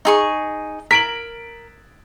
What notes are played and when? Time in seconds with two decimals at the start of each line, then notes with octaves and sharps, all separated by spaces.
0.05 D#4 G#4 C#6
0.91 A#4 B6 D7 F#7